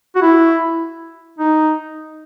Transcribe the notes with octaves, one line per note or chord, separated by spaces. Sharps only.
F#4
E4
D#4